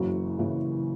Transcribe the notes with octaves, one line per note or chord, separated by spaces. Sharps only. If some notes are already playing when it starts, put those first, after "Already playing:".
Already playing: F#1 F#2 C#3 E3 F#4
F#1 F#2 C#3 E3